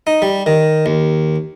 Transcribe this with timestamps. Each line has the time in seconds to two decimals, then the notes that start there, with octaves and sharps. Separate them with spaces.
0.07 D#4
0.22 G3
0.46 D#3
0.86 D#2